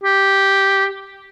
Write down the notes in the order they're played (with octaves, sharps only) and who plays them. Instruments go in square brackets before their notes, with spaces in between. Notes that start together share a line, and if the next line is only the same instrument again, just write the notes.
[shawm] G4